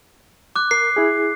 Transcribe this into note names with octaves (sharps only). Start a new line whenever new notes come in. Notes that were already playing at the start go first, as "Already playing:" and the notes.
D6 F#6
A#4 C7
E4 G#4